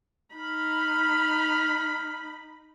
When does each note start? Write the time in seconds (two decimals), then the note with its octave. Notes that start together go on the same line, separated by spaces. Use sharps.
0.35 D#4 B5 F6